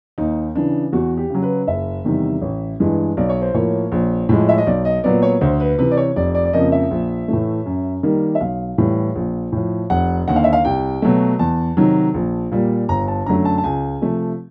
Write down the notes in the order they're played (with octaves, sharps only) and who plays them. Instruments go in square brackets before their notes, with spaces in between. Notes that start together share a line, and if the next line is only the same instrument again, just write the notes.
[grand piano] D#2 D#4
C#3 E3 D4
E2 F#4
G4
C#3 F#3
B4
F#1 E5
E2 C3 D#3 G3
A1
G2 E3 G#3
B1 D5
C#5
C5
A2 F3 A#3 C#5
A#1
A2 F3 G#3
E5
D#5
B1 D5
D#5
A#2 F#3 B3 D5
C#5
D2 C5
B4
C3 E3 B4
D5
C#5
F1 D5
D5
D5
F2 C#3 F3 A#3 D#5
E5
A#1
A2 E3 A3
F#2
D#3 G3 A#3
E5
B1 F5
A2 E3 G3
A#1
A2 F3
F1 F#5
D#2 D3 F#5
F5
E5
F5
C2 G5
B2 F#3 A3
E2 A5
C3 D#3 F#3
A#1
A#2 G3 A#3
G1 A#5
A5
F#2 D3 F#3 A3 A#5
A5
A5
C#2 G#5
C3 F3 A3